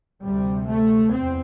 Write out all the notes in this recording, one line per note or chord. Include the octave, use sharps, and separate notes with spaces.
D2 C3 G3
A3
E2 C4